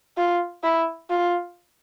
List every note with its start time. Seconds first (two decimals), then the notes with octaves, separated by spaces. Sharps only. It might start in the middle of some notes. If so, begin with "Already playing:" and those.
0.17 F4
0.63 E4
1.10 F4